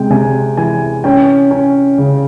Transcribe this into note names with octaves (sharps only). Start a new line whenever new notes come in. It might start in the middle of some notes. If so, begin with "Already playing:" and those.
Already playing: C3 G#3 G5
C3 G#5
E3 G#5
C#4 G5
C#4
C#3